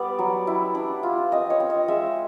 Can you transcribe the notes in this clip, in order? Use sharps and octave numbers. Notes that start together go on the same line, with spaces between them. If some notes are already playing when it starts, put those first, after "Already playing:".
Already playing: G3 B3 D5
F#3
E4
D4
F4
C4 D#5
C#5
C4
D#5
G#3 E5